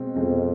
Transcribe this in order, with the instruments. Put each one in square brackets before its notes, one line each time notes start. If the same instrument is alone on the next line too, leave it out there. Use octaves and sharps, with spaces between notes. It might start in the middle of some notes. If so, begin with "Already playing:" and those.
Already playing: [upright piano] B2 G#3 C4
[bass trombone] F2 [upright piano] B2 G#3 C4